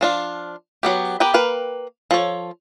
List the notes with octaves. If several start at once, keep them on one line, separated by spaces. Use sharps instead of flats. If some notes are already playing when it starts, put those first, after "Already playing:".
F3 D4 F4
F#3 B3 G4
B3 G4 A#4 B4 G5
A#3 A#4 B4 G5
F3 A4 C#5